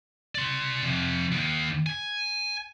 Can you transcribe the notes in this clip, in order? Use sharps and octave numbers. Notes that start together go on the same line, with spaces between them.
D5 C6
C3 F3
D#2 D#3
G#5